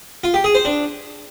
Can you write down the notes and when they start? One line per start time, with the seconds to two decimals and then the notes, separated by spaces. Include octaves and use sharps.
0.24 F4
0.34 G4
0.44 G#4
0.55 C5
0.65 D4